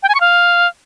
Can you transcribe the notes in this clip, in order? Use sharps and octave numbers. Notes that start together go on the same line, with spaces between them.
G5
G#5
C#6
F5